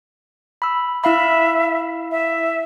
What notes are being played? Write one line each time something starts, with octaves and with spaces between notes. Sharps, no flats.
B5 E6
E4 E5 F5 B5
E5